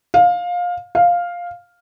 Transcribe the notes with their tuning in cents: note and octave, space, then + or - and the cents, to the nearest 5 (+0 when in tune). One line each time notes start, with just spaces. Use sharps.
F5 +20
F5 +5